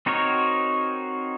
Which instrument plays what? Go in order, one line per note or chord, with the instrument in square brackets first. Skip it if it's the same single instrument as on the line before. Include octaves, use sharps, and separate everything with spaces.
[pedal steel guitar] C4 D#4 F#4 A#4 C#5